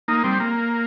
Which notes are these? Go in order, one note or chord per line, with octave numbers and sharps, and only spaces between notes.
A#3 D#4
G3 C4
A#3